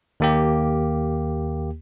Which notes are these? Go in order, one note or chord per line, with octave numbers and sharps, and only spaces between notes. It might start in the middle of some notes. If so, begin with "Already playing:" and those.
D#2 A#3 G4